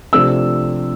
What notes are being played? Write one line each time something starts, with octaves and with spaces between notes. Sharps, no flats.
C3 F3 A3 D4 E6